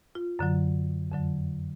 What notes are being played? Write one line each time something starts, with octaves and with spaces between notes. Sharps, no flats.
F4
F#2 D3 F#3
F2 D3 F#3